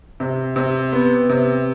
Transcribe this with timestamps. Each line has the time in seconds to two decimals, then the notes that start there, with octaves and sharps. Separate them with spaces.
0.20 C3
0.56 C3
0.92 B3
1.29 C3